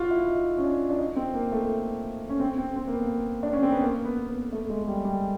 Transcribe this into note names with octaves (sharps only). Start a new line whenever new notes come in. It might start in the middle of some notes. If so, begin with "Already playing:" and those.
Already playing: F4 F#4
E4
D#4
C#4
D4
D4
D#4
C4
A#3
A3
C#4
C4
C4
C4
A#3
B3
D4
C#4
C4
B3
A#3
B3
B3
A3
G#3
G3
G3